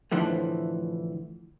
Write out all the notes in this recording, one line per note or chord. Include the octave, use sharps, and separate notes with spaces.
A2 D3 E3 F3 A3